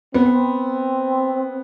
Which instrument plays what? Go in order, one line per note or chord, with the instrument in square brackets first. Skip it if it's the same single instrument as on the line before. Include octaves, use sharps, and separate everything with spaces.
[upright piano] B3 [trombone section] C4